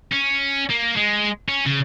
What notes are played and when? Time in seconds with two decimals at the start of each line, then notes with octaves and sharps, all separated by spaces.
0.12 C#4
0.70 A#3
0.97 G#3
1.48 C#4
1.66 C#3